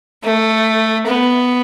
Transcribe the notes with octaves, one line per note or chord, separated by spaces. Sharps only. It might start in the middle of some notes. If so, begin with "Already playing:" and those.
A3
B3